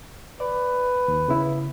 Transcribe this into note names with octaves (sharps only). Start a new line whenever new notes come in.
B4 D5
D#2
C#3 B3 E4